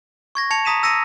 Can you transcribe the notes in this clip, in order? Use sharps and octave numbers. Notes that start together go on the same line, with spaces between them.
C#6 G#6 A#6
A5 G#6 C#7 F7
A#5 D#6 B6 D#7 E7
E6 A#6 C#7 D#7